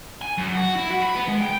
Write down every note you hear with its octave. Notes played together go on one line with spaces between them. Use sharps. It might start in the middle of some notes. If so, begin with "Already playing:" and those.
G#5
F#2
F#4
E4
F#4
B5
B3
G#3
G5